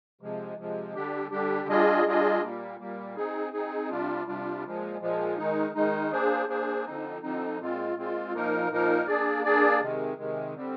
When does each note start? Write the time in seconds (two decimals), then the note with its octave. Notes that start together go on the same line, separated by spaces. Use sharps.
0.21 C3 F3 G#3
0.58 C3 F3 G#3
0.94 D3 G3 D4 G4
1.31 D3 G3 D4 G4
1.68 G3 D4 F4 G#4 D#5
2.05 G3 D4 F4 G#4 D#5
2.42 A#2 G3 A#3
2.79 A#2 G3 A#3
3.16 C4 D#4 G#4
3.52 C4 D#4 G#4
3.90 C3 G3 D4 F4
4.27 C3 G3 D4 F4
4.64 A#2 F3 G#3
5.01 A#2 F3 G#3
5.37 D#3 G#3 D#4
5.75 D#3 G#3 D#4
6.11 A#3 D4 G#4 C5
6.48 A#3 D4 G#4 C5
6.85 D3 F3 C4 D#4
7.22 D3 F3 C4 D#4
7.59 A#2 G#3 C4 F4
7.96 A#2 G#3 C4 F4
8.33 A#2 F3 A#3 D#4 A#4
8.70 A#2 F3 A#3 D#4 A#4
9.06 A#3 D4 G#4 D5
9.44 A#3 D4 G#4 D5
9.81 C3 D#3 G#3
10.18 C3 D#3 G#3
10.55 D3 G3 C4